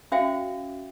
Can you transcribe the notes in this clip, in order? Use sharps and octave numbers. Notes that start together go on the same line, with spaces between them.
C#4 F#4 C5 E5 F5 G5